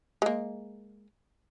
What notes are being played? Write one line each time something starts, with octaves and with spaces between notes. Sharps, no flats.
G#3 A#3